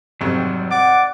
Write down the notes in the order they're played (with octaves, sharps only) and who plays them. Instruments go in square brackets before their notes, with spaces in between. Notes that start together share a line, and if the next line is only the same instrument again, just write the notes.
[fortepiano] G#1 F2 C3 [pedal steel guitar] F#3 G3
[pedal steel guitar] D5 [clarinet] F#5 [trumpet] D6